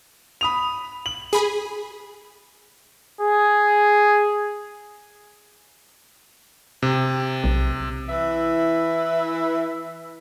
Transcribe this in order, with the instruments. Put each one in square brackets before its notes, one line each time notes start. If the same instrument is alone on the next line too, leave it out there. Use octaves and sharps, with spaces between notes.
[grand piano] B5 D#6 F7
F#7
[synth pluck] G#4 B5
[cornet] G#4
[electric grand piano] C3
[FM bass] B1
[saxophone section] E3 E4 E5